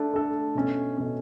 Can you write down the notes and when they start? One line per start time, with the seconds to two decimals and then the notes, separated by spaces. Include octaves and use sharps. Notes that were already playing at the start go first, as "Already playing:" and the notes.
Already playing: A3 D4 A4
0.14 A3 D4 A4
0.55 B2 A3 C#4
0.97 B2 A3 C#4